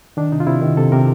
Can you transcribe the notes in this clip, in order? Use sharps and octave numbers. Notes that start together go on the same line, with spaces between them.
D#3 D4
C3 D#4
F4
C3 E4
D#3
C3 A4
C3 A#4